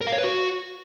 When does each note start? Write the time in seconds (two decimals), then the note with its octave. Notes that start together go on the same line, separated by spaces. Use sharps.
0.01 A#4
0.07 F5
0.12 C#5
0.18 B4
0.24 F#4